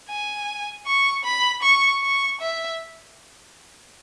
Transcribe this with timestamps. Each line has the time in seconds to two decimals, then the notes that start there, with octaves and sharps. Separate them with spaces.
0.09 G#5
0.86 C#6
1.24 B5
1.62 C#6
2.02 C#6
2.40 E5